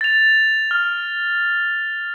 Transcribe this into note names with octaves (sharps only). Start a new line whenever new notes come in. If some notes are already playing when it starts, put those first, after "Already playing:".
A6 F7
F6